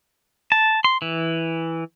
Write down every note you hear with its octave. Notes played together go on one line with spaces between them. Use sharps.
A5
C6
E3